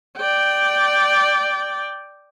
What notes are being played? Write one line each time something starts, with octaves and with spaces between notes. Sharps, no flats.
D5 G5